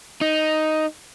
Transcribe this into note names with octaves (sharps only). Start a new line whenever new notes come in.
D#4